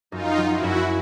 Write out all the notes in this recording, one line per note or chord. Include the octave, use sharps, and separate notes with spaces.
F#2 D#4 F4
F#3
E4 F#4
F#2